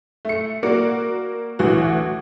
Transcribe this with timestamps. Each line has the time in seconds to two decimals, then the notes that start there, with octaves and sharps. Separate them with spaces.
0.25 A3 C#7
0.63 A#3 F#4 A#4 D5
1.59 A1 D2 E3 F#4